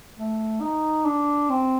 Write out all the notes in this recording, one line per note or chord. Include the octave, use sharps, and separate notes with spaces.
A3
D#4
D4
C4